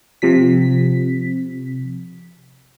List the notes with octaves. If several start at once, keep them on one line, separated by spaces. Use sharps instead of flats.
C3 F3 B6